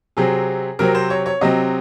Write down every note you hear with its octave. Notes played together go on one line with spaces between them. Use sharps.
C3 F#3 C4 G#4
C3 F#3 C4 A#4
C5
C#5
C#5
C3 F#3 C4 D#5